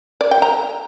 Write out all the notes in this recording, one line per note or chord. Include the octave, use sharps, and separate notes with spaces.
D5
G5
A#5